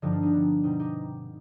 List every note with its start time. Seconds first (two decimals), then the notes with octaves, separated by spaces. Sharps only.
0.02 G2 D3 F3 D#4 G4
0.12 D4 F4
0.23 C4 D#4
0.33 B3 D4
0.64 B2 C4 D#4
0.80 D#4 G4